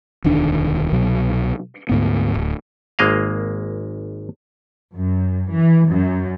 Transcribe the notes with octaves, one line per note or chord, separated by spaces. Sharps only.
E1 D2 D#3 D4
C2 B2 F#3
D2 G#2 B3
D1
G#1 G#3 A#3 D#5 F5
F#2
E3
F#2